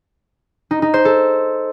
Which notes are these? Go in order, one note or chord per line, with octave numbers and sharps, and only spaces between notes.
D#4
D#4
C5
A4